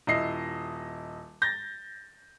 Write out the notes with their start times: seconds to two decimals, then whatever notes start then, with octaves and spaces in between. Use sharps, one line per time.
0.07 D#1 E4 D#5 C7
1.42 G6 A6 A#6